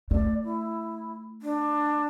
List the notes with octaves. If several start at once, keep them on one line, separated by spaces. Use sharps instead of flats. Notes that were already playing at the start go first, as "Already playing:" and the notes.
A3 D5
E4
D4